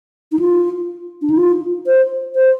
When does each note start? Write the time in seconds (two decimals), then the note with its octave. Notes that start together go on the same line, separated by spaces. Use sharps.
0.32 D#4
0.39 F4
1.22 D4
1.30 D#4
1.37 F4
1.86 C5
2.35 C5